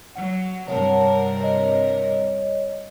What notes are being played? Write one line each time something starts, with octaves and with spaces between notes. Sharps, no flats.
F#3 F#5
G2 C3 A#4 C#5 F#5 A5
C#5 D#5